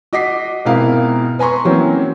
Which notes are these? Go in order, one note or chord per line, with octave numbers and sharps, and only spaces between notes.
F#4 D#5 D6 B6 C7
G#2 B2 C4 E4 A#4 F5
B4 G#5 A#5 C6 C#6
E3 F#3 A#3 C4 C#4